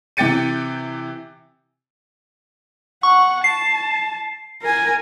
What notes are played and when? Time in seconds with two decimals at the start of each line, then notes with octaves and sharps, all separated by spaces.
0.17 C3 E3 G5 A6 C#7 D#7
3.03 F#5 C#6
3.44 A5 C7
4.63 A#4 G#5